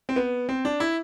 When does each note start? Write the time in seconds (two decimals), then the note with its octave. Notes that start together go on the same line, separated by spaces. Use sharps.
0.09 C4
0.16 B3
0.49 C4
0.65 D4
0.80 E4